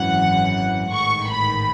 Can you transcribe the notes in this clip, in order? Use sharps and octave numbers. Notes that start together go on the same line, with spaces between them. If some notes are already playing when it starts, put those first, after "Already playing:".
Already playing: G#1 F#2 E3 F#5
A1 G#2 D#3 C#6
B5